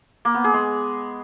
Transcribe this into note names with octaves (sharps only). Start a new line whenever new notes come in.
A#3
B3
G#4
G#3